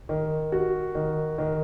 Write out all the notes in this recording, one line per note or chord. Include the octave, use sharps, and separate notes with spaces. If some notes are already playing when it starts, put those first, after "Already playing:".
D#3
F#4
D#3
D#3